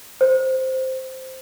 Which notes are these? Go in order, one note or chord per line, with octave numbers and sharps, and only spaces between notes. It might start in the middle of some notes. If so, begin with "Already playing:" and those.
C5